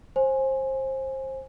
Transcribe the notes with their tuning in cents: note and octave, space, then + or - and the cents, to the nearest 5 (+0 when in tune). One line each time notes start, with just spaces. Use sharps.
C5 +25 G#5 +0